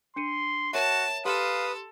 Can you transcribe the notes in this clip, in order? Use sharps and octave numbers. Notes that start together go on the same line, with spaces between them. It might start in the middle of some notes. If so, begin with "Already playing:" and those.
D4 C6 C#7 D#7
F#4 A#4 C#5 E5 A5
G4 A4 B4 F5 C6 D#6